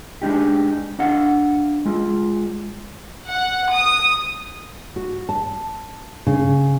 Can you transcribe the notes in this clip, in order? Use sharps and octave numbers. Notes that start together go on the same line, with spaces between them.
G#3 D4 D#4 G4
D4 D#5 F5 F#5
G#3 F4
F#5
D#6
F#4
A5
C#3